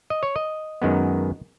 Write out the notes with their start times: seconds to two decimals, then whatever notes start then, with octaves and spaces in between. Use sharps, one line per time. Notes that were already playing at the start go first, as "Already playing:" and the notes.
0.10 D#5
0.23 C#5
0.36 D#5
0.82 F#2 D#3 G#3 B3